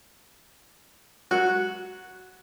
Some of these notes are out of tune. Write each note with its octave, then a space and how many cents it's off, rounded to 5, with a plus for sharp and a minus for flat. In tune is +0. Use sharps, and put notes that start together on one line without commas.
F#3 +10 F#4 -5